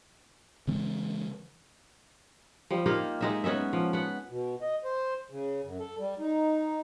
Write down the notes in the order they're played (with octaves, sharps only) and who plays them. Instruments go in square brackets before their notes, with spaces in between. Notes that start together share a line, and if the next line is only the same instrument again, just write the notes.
[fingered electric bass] C#3 E3 G#3 C4
[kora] F3 G3
A#3 D#4 F4 G4
G#3 D#4 E5
B3 C#4 D#4 E5
F3
B3 F#5
[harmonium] B2
D#5
C5
C#3
F#2
A4
G3
D#4